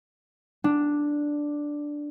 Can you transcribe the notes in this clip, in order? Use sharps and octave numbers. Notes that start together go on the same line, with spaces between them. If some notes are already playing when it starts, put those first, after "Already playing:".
D4